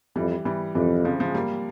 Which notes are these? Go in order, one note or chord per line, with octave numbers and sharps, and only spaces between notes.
F2 E3 G3
E3 G3
F2 C3 E3
C#3 F3
F3 G#3
G3 A#3